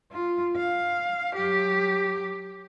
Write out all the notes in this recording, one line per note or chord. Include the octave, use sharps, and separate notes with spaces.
F4
F5
F#3 G4